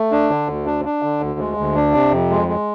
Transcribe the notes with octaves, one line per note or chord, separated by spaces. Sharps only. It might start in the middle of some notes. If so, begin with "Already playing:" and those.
Already playing: A3
D4
D3
D2
D4
D4
D3
D2
G#3
D2
D4
C3
F2
G#3
G#3